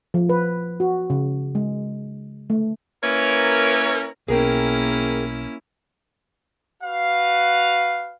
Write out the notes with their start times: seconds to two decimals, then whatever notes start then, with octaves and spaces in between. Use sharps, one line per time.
0.14 F3
0.29 B4
0.80 F#4
1.10 C#3
1.55 G#3
2.50 A3
3.03 A#3 C#4 E4 A#4 B4 C#5
4.28 B1 B2 A#3 C#4 E4 G#4 A#4 G5
6.82 F#4 B4 F5